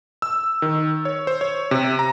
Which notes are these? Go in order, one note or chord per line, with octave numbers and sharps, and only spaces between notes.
E6
D#3
C#5
C5
C#5
C3
A#5